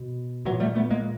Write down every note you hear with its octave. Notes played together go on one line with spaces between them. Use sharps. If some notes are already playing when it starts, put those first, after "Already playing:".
Already playing: B2
A#2 E3 F#3
G3 A3
A3 B3
G#3 A#3